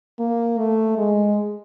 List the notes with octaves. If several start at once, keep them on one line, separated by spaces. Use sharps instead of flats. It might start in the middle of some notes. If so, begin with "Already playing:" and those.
A#3
A3
G#3